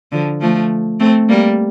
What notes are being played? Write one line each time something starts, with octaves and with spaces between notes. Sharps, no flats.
D3 F3
F3 A3
A3 C4
G3 A#3